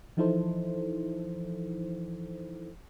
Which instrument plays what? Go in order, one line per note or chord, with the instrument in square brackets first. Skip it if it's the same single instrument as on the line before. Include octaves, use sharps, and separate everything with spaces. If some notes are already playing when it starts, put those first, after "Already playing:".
[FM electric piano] E3 F3 D#4 E4 A4 C5